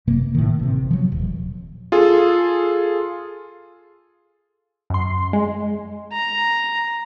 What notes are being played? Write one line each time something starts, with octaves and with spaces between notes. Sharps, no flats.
F#1 C3 A#3
A2 D#3
A1 C3
F3 F#3
D#1
F4 G#4 A4
F#2 C6
G#3
A#5